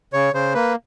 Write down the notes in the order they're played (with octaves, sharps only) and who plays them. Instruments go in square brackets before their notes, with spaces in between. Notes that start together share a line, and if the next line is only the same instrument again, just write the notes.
[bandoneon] C#3 C#5
C#3 C5
A#3 B4